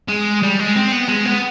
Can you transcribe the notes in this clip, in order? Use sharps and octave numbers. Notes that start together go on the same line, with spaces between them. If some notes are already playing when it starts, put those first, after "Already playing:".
G#3
G3
G#3
C4
B3
G#3
B3